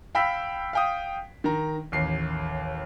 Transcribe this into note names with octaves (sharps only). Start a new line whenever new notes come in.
F5 G5 B5 E6 B6
F5 G5 D#6
D#3 A#5
A1 D#2 C7